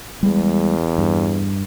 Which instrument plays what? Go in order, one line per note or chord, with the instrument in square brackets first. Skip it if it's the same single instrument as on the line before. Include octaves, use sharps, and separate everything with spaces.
[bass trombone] E2 [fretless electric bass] G3 G#3
[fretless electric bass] G2